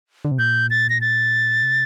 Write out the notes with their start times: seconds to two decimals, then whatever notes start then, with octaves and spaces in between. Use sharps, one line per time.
0.25 D3
0.31 C3
0.39 A#2 G6
0.70 A6
0.90 A#6
1.01 A6
1.63 C3